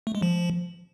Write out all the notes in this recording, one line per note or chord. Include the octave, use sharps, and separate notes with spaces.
A3
G#3
F3